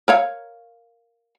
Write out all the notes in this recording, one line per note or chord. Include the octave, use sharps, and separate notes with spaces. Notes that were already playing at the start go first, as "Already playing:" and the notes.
A#4 C#5 F5